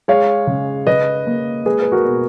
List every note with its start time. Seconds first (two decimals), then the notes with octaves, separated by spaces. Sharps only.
0.08 G#3 C#5 F5
0.47 C#3
0.87 C#3 B4 D#5
1.27 A#3
1.65 G#3 G#4 B4
1.82 B4
1.92 F#4 A#4
2.05 B2